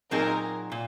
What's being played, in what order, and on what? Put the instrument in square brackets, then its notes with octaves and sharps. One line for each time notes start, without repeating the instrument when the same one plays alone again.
[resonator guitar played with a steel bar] A#2 F#3 C4 D#4 G#4 [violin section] A#4
[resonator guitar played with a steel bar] A#2